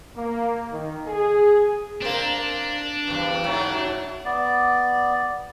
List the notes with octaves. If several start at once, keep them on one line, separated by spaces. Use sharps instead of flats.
A#3
D#3
G#4
A#3 C4 D4
E2 G2
G#2 F#3 E4
B3 D5